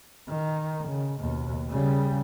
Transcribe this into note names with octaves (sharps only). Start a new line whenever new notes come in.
D#3
C#3
D#2 B2
C#3 G3